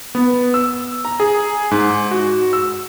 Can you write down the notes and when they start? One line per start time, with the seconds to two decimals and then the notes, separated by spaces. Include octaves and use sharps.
0.15 B3
0.54 E6
1.05 A#5
1.20 G#4
1.71 G#2
2.11 F#4
2.53 E6